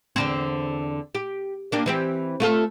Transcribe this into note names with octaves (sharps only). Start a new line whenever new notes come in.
E2 D3 C4
G4
A#3 D4 G4
E3 C4 G4
A3 F4 A4